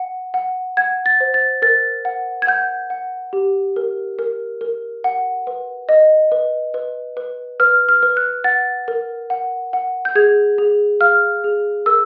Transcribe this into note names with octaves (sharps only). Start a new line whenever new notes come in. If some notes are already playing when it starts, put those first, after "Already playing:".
Already playing: F#5
F#5
F#5 G#6
A6
C5
A6
A#4 A6
F#5
G#6
F#5 G6
F#5
G4
A#4
A#4
A#4
F#5
B4
D#5
B4
B4
B4
B4 F6
F6
B4
F#6
F#5 A6
A#4
F#5
F#5
G6
G#4 G#6
G#4
F5 F6
G#4
A#4 E6